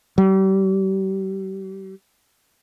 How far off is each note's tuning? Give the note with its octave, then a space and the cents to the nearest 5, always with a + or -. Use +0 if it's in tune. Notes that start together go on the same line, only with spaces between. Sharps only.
G3 -35